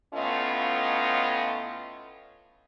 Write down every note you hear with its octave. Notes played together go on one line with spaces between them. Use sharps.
A2 A3 B3 C#4 F4 D#5